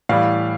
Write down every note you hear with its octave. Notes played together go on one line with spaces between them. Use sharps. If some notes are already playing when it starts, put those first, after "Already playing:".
A2 E3 G3 F5